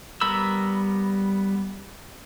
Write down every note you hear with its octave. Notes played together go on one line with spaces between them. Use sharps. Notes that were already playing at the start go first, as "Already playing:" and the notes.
G3 B3 A#4 B5 E6